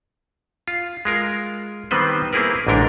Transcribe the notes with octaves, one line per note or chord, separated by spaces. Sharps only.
F4
G#3 F4 A#4
D#3 G3 B3 C4 B4 C5
A#3 C4 E4 G#4 A#4 B4
A1 G#2 D3 D4 A#4 G5